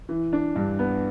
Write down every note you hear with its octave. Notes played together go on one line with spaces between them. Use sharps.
E3
D4
G2
B3